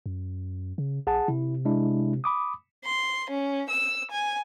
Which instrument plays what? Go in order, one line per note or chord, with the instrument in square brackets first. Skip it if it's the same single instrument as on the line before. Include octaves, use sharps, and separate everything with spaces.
[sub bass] F#2
C#3
[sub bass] A#1 [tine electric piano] G#4 F#5 A5
[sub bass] C3 [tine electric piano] E4
[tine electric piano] G#3 D4 E4
B5 D6 D#6
[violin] C6
C#4
E6
G#5